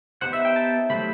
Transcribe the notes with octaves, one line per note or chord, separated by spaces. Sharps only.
B3 D#4 G4 C5 F#5
E5
G5
A5
F#3 A3 D#4 G4 C5 B5